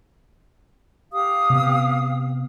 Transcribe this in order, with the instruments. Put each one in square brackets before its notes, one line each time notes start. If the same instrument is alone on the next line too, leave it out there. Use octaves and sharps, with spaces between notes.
[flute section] G4 F5 D#6
[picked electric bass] C3 B3